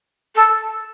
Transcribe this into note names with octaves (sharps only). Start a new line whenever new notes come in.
A4